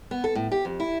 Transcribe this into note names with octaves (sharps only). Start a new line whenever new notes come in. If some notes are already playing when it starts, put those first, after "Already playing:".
B3
A4
A2
G4
F2
E4